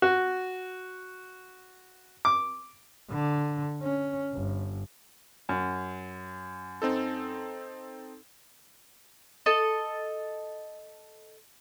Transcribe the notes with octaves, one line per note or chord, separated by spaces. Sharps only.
F#4
D6
D3
C#4
G1
F#2
C4 D#4 A4
A4 D#5